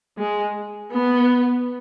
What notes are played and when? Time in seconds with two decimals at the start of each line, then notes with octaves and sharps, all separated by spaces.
0.18 G#3
0.91 B3